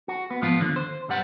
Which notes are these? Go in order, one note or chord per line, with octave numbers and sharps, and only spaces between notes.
F#4
B3
G#2 F3 B3 F4
D#2 D3
C5
B1 G2 G3 F#5